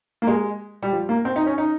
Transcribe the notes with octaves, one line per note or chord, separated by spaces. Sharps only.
A#3
G#3
G3
F3
A#3
C4
D#4
C#4
D#4